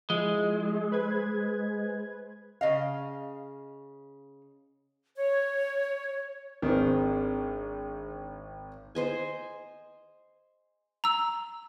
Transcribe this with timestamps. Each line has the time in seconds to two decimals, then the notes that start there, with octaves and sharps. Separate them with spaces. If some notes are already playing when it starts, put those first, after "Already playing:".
0.10 F3 G#3 E4
0.92 B4 C5 G#6
2.61 C#3 D#5 F5
5.16 C#5
6.62 G#1 D#3 C4 D4 G#4 C5
8.95 C5 D#5 G#5
11.04 A#5 E6